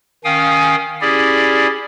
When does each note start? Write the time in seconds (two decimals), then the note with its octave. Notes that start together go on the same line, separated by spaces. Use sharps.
0.25 D#3 C#4 F5 G5 G#5 D#6
1.01 C#4 E4 G4 G#4 D5